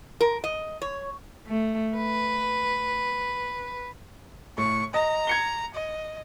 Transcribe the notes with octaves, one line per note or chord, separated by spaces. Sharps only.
A#4
D#5
C#5
A3
B4
A2 C#6
D#5 A#5
G#6 C#7 G7
D#5